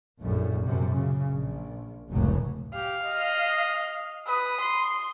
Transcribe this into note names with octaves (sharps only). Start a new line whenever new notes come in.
A#1 F#2 A2
F#2 C3
C#3
A#1
F1 C#2 A2 F#3
G4 F5
D#5
B4 D#6
C6